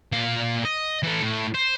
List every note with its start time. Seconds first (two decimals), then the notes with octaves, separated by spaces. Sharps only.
0.12 A#2 F5
0.65 D#5
1.03 E3 A4
1.22 A2
1.54 C5